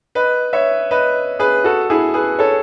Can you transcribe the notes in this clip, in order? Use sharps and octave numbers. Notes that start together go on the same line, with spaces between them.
B4 D#5
C#5 E5
B4 D#5
G#4 B4
F#4 A4
E4 G#4
G#4 B4
A4 C#5